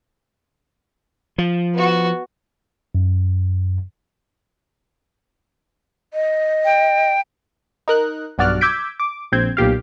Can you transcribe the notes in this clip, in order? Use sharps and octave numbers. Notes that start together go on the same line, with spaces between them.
F3
B3 F#4
F#2
D#5
G5
D#4 A#4 F#6
B1 G2 F#4 D5 F6 F#6
D6 E6 G6 G#6 B6 D7
D6
A#1 C4 G6 G#6
B1 A#2 G4 F5